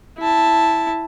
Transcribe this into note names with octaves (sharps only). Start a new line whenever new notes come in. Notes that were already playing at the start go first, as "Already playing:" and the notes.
E4 A5